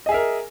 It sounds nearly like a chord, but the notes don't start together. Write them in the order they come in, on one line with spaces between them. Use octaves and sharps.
D#5 G#4 E5 A#4